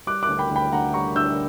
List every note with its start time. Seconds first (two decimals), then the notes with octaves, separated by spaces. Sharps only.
0.07 G3 D6 F#6
0.23 D6 F#6
0.29 D2
0.39 G5 B5
0.51 D2
0.56 G5 B5
0.72 D2 F#5 A#5
0.94 G3 A#5 C#6
1.15 D3 E6 G6